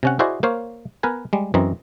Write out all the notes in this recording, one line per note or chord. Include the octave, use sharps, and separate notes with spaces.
C3 C#4 F#5
E4 F#4 G#4 C5 D5 D#5
A#3 C5 C#5 F5
B3 A#4 B4 G#5
G3 G#3
F#2 E3 C4 D#5 A#5